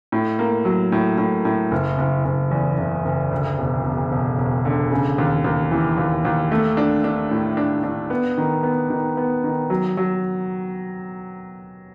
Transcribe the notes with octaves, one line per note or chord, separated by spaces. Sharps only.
A2
A#3
F#3
A2
A2
A2
F#1
F#1
F#1
E2
F#1
F#1
D2
E1
E1
E1
E1
D3
C#3
D#2
D#2
E3
D#2
D#2
A3
D4
D4
A2
D4
D4
B3
D#3
B3
D#3
B3
D#3
F#3
F#3